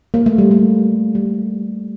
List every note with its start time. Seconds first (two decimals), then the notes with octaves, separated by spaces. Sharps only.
0.14 A#3
0.26 A3
0.38 G3
0.51 A3
1.15 G3